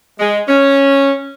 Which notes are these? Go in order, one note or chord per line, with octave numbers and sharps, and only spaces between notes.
G#3
C#4